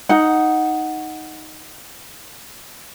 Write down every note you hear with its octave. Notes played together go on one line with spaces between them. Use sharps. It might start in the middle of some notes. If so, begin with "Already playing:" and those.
D#4 F#5